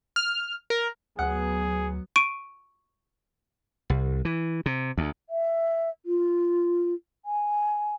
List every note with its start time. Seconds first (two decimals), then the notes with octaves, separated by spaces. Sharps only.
0.16 F6
0.70 A#4
1.19 D2 F#3 B3 G#4 F#5
2.16 C#6 D7 D#7
3.90 C2
4.25 E3
4.66 C3
4.98 D2
5.30 E5
6.06 F4
7.25 G#5